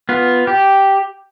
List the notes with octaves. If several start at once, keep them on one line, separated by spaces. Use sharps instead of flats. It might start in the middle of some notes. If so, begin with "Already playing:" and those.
B3 F4
G4